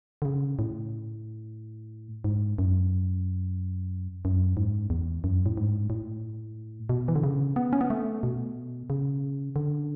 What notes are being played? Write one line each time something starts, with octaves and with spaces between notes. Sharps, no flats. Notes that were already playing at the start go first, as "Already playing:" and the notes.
D3
C#3
A2
G#2
F#2
F#2
G#2
E2
F#2
A2
G#2
A2
B2
E3
D3
C#3
B3
C#4
B3
A3
B2
C#3
D3